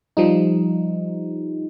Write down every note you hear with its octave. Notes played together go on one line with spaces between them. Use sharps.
F3 G3 D#4